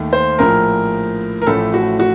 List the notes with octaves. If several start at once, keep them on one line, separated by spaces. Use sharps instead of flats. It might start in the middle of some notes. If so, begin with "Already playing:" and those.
Already playing: D#2 D#3 A3
C5
A#1 A2 F3 A#4
A#4
A1 A2 F3 A3 A4
F#4
F#4